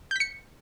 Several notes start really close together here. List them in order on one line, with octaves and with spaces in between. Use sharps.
G6 B6 C#7